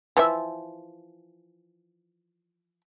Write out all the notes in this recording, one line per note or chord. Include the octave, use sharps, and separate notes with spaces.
E3 F3 E5